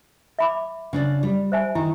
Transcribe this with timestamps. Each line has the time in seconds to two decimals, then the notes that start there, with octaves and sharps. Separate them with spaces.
0.39 E5 B5 D6
0.93 C#3 D4 D5
1.23 G3
1.52 C5 E5 G#5
1.75 D#3 E4